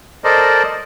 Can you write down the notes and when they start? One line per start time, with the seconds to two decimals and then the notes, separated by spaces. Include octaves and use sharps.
0.24 A4 A#4 C5 D5 D#5